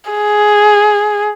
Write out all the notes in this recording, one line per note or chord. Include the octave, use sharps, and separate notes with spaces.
G#4